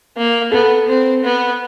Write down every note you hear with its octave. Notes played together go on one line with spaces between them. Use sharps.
A#3
B3 A4
C4
B3